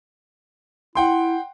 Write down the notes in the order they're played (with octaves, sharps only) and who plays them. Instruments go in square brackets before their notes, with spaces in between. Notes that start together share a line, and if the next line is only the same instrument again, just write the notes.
[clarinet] E4 [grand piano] F#5 G5 C6